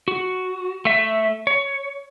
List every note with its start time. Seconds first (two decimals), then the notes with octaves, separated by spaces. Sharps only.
0.08 F#4
0.85 A3 E5
1.47 C#5